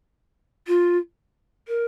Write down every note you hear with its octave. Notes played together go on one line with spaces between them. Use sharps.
F4
A#4